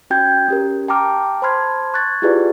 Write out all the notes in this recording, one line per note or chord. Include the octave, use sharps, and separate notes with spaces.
C#4 F#4 G5 G6 G#6
C#4 G4 A#4
G5 A5 A#5 D6 F6
C5 A5 B5 C6 F6 G#6
C#6 F#6 G#6 A6
E4 F4 G4 G#4 B4 D5